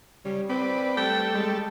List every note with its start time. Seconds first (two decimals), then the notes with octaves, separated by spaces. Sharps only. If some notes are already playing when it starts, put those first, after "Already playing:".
0.25 C#3 G3
0.49 C4 B4 D5
0.97 G3 A3 A4 G5
1.34 G#3